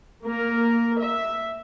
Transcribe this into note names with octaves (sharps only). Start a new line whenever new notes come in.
A#3 A#4
E5